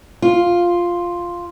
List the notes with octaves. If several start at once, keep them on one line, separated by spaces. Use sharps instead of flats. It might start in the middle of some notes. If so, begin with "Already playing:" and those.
F4